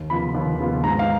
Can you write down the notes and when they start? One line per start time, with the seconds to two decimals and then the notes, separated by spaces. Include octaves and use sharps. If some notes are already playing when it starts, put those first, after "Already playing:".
Already playing: D#2
0.10 C#3 F3 B3 F4 B5
0.35 D#2
0.59 C#3 F3 B3 F4
0.83 G#2 A#5
0.99 F5